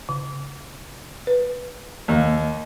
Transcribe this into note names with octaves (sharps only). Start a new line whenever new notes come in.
C#3
B4
D#2